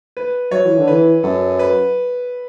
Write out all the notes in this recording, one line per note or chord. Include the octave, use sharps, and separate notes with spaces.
B4
F#3 C#5
E3
D3
E3 B4
F#2 A4
B4